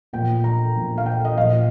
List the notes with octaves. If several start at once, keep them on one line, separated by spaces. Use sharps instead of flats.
A#2 F3 G5
A#5
A#2 F3
F5
G5
D#5
A#2 F3 F5